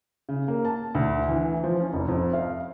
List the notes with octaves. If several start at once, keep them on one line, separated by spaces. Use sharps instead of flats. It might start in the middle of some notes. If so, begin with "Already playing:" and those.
C#3
A#3
A5
D2
E3
F3
C#4
F1
F2
F5